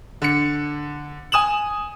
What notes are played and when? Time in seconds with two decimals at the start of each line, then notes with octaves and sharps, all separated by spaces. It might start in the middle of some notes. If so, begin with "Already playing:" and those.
0.22 D3 C#7
1.32 G#5 D#6 E7 F#7